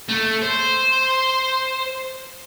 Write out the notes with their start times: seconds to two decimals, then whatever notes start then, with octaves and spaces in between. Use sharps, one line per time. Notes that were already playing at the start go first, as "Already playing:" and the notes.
0.09 A3
0.42 C5